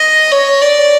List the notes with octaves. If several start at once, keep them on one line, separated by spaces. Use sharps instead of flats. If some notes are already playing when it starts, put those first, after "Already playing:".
Already playing: D#5
C#5
D5